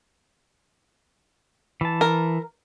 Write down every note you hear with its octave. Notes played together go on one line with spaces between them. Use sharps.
E3 A5
A#4